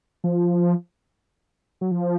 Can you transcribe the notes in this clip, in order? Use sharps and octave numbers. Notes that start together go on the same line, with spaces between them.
F3
F#3
F3